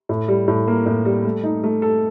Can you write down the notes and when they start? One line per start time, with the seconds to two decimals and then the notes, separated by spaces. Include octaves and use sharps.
0.09 A2
0.28 G3
0.48 A2
0.68 A#3
0.86 A2
1.05 G3
1.25 A3
1.44 D#4
1.64 A3
1.82 A4